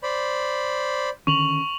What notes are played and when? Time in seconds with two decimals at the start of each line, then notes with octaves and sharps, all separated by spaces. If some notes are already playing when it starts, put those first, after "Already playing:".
0.03 C5 D5 B5
1.27 D3 D#3 C#4 C#6 F7 F#7